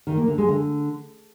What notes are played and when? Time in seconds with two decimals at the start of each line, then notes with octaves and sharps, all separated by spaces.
0.07 D#3
0.17 A#3
0.28 D3
0.38 G#3
0.48 D3